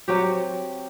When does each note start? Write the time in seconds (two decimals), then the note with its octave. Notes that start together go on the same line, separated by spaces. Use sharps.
0.08 F#3 C4 F#4 G4